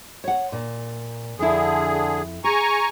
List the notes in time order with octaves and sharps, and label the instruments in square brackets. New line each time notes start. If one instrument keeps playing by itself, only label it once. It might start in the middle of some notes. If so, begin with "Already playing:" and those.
[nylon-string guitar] C#5 F#5
A#2
[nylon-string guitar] F2 E4 [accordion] D3 G#4
[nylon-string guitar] G#4 [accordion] G#5 A#5 C#6